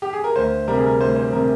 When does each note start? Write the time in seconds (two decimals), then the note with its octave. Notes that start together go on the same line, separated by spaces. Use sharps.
0.02 G4
0.13 G#4
0.24 A#4
0.36 D2 C5
0.68 C3 G3 A#4
0.77 G#4
0.86 A#4
1.00 D2 C5
1.16 C5
1.33 C3 G3 A#4